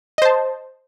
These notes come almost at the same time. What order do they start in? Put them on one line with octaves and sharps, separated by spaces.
D#5 C5 A5